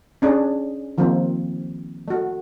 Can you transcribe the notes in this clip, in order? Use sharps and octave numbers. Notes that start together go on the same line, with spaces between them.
C#4 D4 G#4
D#3 F3 A#3 C4
A3 F#4